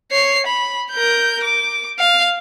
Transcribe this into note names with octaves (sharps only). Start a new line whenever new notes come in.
C#5 C7
B5
A#4 G6
D6
F5